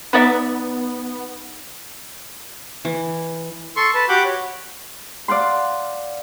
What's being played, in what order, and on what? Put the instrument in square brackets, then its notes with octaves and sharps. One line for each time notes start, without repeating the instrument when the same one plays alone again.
[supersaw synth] B3 [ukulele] D#4 D5 E5
[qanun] E3
[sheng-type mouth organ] A4 C6 C#6
B4 A5
F#4 G4 F#5 B5 D6 G6
C#5
[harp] D5 F5 F#5 C6